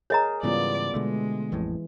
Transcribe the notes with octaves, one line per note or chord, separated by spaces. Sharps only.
G#4 A#4 C#5 D#5 A#5
G#2 C#3 E3 G3 B3 F4 D5
B2 D3 G#3 A3
A1 F2 A2 E3